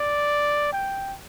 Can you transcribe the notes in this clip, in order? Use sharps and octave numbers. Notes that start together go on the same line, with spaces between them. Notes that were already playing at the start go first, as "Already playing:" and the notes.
Already playing: D5
G5